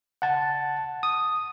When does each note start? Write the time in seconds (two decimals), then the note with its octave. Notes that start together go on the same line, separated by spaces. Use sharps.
0.22 F#5 A5
1.03 D#6